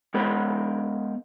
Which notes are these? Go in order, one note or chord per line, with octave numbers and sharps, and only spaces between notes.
G#3 B3 A#4 C5 G5 B5